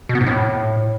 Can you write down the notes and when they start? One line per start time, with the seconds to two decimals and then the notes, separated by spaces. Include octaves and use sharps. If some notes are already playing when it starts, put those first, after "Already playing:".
0.09 B2
0.15 B3
0.21 G#2
0.26 A2